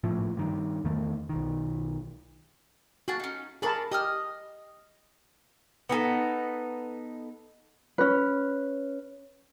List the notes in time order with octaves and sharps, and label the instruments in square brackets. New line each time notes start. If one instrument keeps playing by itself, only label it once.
[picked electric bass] G#1 A2 F3
G2 D#3
E2 D#3 A3
B1 D#3
[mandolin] A#3 G#4 A5 [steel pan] F#4
[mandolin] C#4 D#4
[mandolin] D4 B5 C#6 [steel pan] G#4 A#4 A5
[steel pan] G4 [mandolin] D#5 D#6 F6
[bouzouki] B3 D#4 G#4 A4
[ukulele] C#4 B4